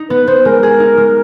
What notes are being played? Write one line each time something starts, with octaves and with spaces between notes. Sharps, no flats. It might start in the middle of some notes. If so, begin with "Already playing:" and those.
Already playing: D#4
B3 B4
B3 C5
G#3 A#4
G#4
D#4
G#3